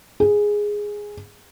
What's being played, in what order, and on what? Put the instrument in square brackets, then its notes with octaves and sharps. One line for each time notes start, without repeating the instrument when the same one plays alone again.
[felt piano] G#4